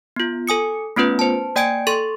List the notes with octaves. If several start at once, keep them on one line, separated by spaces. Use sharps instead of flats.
B3 F4
A4 G#5 D#6 C#7
A3 B3 C#4 F4 B4
C5 A5
A#3 D5 G5 G#5 G#6 D7
A4 C6 C#6 A6